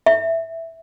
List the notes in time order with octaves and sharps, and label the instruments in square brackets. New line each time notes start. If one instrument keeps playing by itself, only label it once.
[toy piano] E5